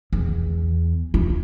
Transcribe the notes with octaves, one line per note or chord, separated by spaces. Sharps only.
E2
F4